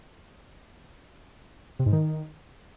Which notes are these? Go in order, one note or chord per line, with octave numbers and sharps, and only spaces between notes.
C3
G#2
D#3